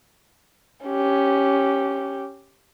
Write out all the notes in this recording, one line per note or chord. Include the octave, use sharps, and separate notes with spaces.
C#4 G4